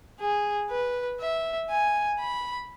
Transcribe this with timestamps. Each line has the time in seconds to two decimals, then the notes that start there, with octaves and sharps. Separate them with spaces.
0.20 G#4
0.70 B4
1.20 E5
1.70 G#5
2.20 B5